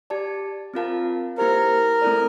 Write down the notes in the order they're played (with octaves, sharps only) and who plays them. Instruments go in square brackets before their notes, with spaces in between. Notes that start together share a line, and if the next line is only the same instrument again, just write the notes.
[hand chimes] G4 D5 A5
C4 F4 A#4 F5 A5
[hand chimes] A#3 E4 G4 C5 [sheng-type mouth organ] A#4
[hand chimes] A3 C4 E4 A4 D5